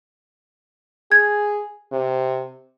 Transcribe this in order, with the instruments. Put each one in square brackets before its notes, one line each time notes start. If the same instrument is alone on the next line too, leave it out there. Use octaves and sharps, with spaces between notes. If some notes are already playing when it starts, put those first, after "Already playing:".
[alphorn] G#4 [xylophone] G#6
[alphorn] C3